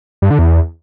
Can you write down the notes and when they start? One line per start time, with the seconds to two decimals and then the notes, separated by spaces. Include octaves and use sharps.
0.22 G2
0.30 D3
0.39 E2